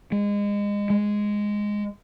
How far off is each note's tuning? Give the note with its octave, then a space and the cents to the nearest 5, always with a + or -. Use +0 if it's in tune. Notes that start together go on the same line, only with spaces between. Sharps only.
G#3 -25
G#3 -5